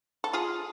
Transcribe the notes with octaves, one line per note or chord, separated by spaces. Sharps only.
A4
F4 G#4